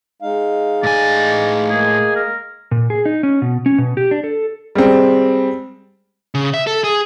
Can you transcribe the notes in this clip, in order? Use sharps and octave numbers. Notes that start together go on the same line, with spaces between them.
G#3 D#4 F5
A2 D5 G#5
G#3 A#3 G#4
A#4
A#2
G#4
D#4
C#4
B2
C#4
B2
G4
D4
A4
G3 G#3 C4
C#3
E5
A4
G#4